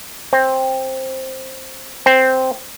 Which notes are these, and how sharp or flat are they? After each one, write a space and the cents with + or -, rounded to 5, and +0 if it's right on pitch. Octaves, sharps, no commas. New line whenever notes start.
C4 +10
C4 -5